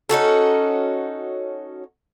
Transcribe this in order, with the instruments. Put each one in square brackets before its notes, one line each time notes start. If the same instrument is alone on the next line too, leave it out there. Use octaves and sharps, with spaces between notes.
[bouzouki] C#4 D#4 F#4 A4